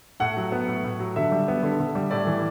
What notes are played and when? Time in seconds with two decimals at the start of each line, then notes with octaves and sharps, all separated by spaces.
0.20 A2 F#5
0.37 F#3
0.52 B3
0.68 A2
0.83 A2
0.99 F#3
1.16 D3 E5
1.32 G3
1.48 B3
1.63 D3
1.80 D3
1.95 G3
2.11 A2 D5
2.27 E3